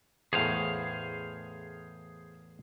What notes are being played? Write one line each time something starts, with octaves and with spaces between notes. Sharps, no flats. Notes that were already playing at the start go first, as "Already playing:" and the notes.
E2 A2 G#4 C5 F5